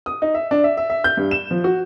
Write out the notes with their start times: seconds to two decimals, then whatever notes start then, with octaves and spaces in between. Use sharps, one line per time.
0.06 D#6
0.22 D#4
0.34 E5
0.51 D4
0.64 E5
0.77 E5
0.90 E5
1.04 G6
1.17 G2
1.31 E7
1.51 F3
1.64 F#4